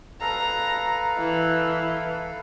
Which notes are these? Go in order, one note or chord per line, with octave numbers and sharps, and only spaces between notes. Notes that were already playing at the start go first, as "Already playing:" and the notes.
A4 B4 F5 A#5
E3